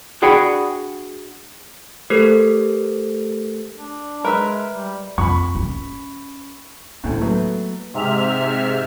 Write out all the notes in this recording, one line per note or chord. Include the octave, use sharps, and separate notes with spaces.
D4 F#4 G#4 F#5 G5 B5
A3 G4 A4 A#4 C5
D4
G#3 A#4 B4 E5
G3
F2 B5 C#6
C#4
D2 A2 A#3
F#3 A3 B3
G#2 C3 E5 F6